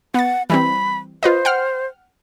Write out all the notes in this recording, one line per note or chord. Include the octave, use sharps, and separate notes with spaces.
B3 F#5 A6
E3 G3 C4 B5
F4 B4 C5 D#5
F#5 G5 F6